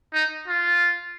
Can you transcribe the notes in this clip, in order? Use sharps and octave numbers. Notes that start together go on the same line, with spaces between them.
D#4
F4